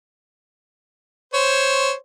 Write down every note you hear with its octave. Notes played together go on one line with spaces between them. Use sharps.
C5 C#5